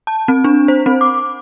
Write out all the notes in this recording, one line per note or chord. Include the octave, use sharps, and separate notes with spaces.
A5
C4
D4
C5
C4
D6